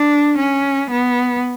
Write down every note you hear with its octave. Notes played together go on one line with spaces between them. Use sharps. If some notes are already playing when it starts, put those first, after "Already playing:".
Already playing: D4
C#4
B3